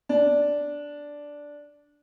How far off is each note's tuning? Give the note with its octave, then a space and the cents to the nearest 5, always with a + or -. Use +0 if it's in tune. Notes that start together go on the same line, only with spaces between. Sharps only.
D4 -5